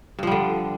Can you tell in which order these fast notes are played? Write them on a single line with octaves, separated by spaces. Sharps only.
G2 F3 G3 D3